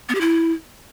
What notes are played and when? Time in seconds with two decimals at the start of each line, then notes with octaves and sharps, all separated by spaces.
0.09 B3
0.15 G4
0.21 E4